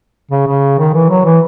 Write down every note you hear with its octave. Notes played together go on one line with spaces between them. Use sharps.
C#3
C#3
D#3
E3
F#3
E3